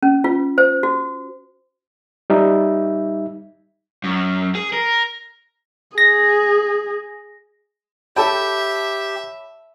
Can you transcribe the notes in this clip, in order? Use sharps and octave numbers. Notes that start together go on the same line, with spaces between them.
C#4
F4
C5
F#4
G3 D#4 E5
F#2
G#4
A#4
G#4 A#6
G4 A4 C#5 E5 G5 A5 B5